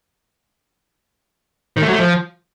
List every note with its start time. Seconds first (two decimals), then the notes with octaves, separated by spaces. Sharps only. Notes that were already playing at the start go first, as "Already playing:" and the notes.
1.77 D#3
1.82 A3
1.87 F#3
1.93 A3
1.98 F3